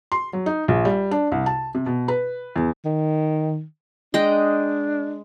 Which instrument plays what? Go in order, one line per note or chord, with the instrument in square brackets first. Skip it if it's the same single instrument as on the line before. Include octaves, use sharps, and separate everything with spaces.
[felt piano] C6
F#3
D#4
A#1
G3
D4
C2
A5
C3
B2
B4
E2
[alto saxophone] D#3
[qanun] G#3 D#5 G5 [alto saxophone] D4